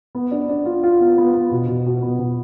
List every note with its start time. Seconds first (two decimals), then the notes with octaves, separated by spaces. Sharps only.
0.15 B3
0.31 D4
0.49 D4
0.65 F4
0.83 F4
1.00 B3
1.18 B3
1.34 B3
1.52 B2
1.68 B2
1.86 B2
2.02 B3
2.19 B2